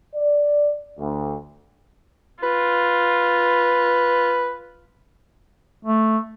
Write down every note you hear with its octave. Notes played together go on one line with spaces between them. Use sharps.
D5
D2
F4 B4
A3